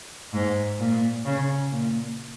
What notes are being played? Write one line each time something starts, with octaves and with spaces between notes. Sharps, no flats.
G#2
A#2
C#3
A#2